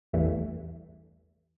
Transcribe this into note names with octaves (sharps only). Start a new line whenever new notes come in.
A1 E2 G2 E3 A3